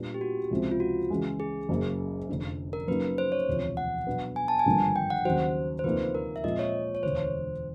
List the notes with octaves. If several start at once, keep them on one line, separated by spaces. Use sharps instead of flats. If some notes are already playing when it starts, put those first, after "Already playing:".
Already playing: A#2 G3 B3 D4
G4
F#4
C#2 C3 F3 G#3 C4
F4
F#4
C#3 E3 G#3
G#4
F#1 F#2 C#3 F#3 A#3
F1 F2 D3
A#4
F#2 C#3 F#3 A#3 D#4 B4
C5
C#5
E1 D2 C3 F3
F#5
B2 F#3 B3 D4
G#5
A5
G#5
G#1 G2 D3 F3 A#3
G5
F#5
D#2 C#3 F#3 C5
C5
D2 C3 F3 A#3 D#4 B4
A#4
E5
A#2 F3 G#3 C4 F4 D#5
C#5
C#5
E1 D2 D3 C5